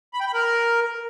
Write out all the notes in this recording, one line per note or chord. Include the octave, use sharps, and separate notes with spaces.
B5
G5
B5
A#4